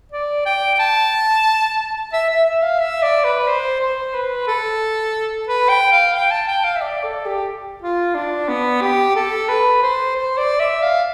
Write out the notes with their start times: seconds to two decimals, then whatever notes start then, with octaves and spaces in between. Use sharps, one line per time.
0.12 D5
0.46 G5
0.75 G5
0.79 A5
2.13 E5
2.29 E5
2.46 E5
2.62 F5
2.80 E5
3.02 D5
3.24 B4
3.47 C5
3.80 C5
4.13 B4
4.47 A4
5.47 B4
5.69 G5
5.92 F5
6.15 G5
6.31 A5
6.48 G5
6.64 F5
6.76 E5
6.81 D5
7.03 A4
7.26 G4
7.82 F4
8.15 D4
8.48 B3
8.81 G4
9.16 A4
9.49 B4
9.83 C5
10.16 C5
10.38 D5
10.60 E5
10.82 F5